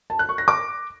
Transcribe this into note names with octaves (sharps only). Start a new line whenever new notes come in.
A5
F#6
C#6
A#6
D6